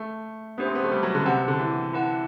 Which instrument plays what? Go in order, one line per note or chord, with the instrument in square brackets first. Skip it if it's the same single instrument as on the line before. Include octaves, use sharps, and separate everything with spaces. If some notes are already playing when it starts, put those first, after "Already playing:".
Already playing: [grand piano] A3
[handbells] A3 D4 G4 C5 [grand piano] B3
[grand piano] C4
B3
A3
G3
F#3
D3
[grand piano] C3 [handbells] G4 B4 F#5 A5
[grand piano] D3
E3
[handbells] E4 B4 F#5 A5